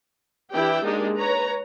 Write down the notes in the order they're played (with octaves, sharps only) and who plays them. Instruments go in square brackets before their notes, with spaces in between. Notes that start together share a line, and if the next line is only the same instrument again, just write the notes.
[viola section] E3 D4 E4 G4 G5
G#3 A#3 D4 D#4 G4
B4 C#5 A#5